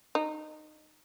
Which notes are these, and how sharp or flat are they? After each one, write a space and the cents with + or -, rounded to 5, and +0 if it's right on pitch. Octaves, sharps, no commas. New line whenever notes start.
D#4 -20